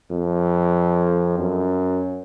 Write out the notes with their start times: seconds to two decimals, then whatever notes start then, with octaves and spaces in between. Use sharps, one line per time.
0.11 F2
1.39 F#2